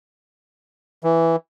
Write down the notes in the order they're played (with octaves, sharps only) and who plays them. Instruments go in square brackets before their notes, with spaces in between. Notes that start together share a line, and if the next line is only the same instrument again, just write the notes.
[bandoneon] E3